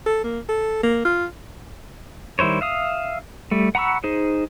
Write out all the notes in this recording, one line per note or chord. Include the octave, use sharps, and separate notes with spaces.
A4
A#3
A4
A#3
F4
D#3 G3 E4 C5 C#5
E5 F5 D#6
G3 A3
F#5 A#5 B5 C#6 E6
D#4 G#4 C5